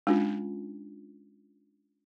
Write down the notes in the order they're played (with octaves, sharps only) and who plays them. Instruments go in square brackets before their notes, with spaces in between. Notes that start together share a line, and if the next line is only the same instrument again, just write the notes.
[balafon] G#3 [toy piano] C#4 D4 F4